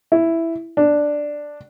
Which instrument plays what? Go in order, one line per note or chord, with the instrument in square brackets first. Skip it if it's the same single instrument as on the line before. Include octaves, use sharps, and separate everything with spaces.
[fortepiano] E4
D4